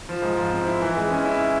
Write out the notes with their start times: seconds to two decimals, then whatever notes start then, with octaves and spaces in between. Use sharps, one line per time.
0.09 F3
0.22 G#2
0.37 F3
0.52 C4
0.67 E4
0.82 E3
0.96 G#3
1.10 C#4
1.25 E4